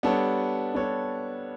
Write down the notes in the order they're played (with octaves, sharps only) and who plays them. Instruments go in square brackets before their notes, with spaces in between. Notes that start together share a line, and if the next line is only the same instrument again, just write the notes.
[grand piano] G3 B3 D4 A4 C#5
G3 B3 D4 A4 C#5